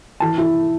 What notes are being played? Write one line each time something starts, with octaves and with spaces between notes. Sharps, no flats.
E3 A5
E4